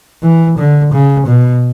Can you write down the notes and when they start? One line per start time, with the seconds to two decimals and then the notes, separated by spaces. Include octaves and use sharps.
0.23 E3
0.57 D3
0.92 C#3
1.27 B2